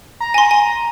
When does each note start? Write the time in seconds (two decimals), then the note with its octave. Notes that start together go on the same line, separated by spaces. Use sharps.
0.20 A#5
0.34 G#5 C6
0.51 G#5